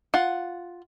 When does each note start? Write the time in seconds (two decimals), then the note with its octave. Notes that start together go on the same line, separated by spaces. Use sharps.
0.14 F4 F#5